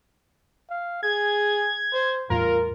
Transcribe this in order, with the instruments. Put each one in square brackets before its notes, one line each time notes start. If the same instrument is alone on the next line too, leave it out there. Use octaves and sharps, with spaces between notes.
[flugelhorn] F5
[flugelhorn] G#4 [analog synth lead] G#6
[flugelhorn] C5
[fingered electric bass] E2 A2 G3 [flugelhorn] F4 [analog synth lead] A#4